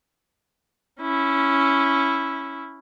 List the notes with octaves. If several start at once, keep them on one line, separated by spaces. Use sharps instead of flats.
C#4 E4